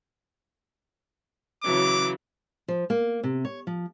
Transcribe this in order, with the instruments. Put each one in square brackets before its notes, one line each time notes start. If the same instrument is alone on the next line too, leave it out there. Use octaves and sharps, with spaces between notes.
[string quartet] C#3 E3 F#3 [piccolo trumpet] D6
[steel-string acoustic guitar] F3
A#3
C3
C#5
F3